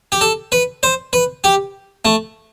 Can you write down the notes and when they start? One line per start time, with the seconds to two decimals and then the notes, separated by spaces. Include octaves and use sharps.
0.12 G4
0.21 A4
0.52 B4
0.83 C5
1.13 B4
1.44 G4
2.05 A3